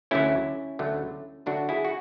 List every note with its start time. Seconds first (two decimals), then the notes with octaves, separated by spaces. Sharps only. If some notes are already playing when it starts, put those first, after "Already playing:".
0.11 D2 D3 F#3 A3 C#4 E4
0.79 D2 D3 F#3 A3
1.46 D2 D3 F#3 A3 D4 F#4
1.69 E4 G#4
1.85 F#4